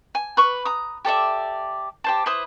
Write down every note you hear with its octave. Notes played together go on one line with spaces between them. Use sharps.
G#5
B4 C#6
A#5 D#6
G4 A4 D5 E5
G4 C5 A5
E4 B4 C5 D#6